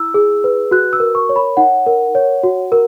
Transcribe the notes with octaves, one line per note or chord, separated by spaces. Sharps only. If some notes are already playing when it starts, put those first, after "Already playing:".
Already playing: E4 E6
G#4
B4
F#4 F#6
E6
A#4
C#6
C#5
B5
D#4 F#5
A#4
C#5
F#4
A#4